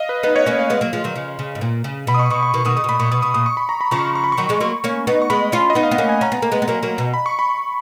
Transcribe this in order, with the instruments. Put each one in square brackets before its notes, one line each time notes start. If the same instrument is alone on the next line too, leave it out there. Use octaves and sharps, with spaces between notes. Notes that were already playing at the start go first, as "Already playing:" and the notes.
Already playing: [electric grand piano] D#5 F5
B4
[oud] B3 D#4 [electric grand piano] B4
[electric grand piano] C#5
[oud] A#3 C#4 [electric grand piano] C#5
[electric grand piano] F5
[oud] G#3 B3
F#3 A#3
F3 G#3
D#3 F#3
C#3 F3
C#3
G#2
A#2
C#3
[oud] B2 [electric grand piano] B5
[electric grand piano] D#6
C#6
[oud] B2 [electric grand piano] C#6
[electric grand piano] C#6
[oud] B2 D#3 [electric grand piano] C#6
[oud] B2 D#3 [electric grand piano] D#6
[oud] C#3 [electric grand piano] D#6
[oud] B2
[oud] A#2 [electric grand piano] B5
[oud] A#2 [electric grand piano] C#6
[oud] B2 [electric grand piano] D#6
[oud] B2 [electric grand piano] D#6
[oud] A#2 [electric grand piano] D#6
[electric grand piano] C#6
B5
A#5
B5
[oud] C#3 F3 [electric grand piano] C#6
[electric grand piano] C#6
B5
C#6
[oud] D#3 F#3
F3 G#3
F#3 A#3
A#3 C#4
B3 D#4
[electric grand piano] C#6
[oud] G#3 B3 [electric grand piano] B5
[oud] C#4 F4
[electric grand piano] D#5
[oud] B3 D#4
[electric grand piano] F5
[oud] B3
[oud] A#3 C#4 [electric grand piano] F#5
[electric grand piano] G#5
[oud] C#4 [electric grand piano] A#5
[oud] B3
A#3
G#3 B3
B3
F#3 A#3
F#3 A#3
B2
[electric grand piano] B5
C#6
B5